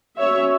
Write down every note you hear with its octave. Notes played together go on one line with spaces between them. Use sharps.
F#3 C#4 C#5 E5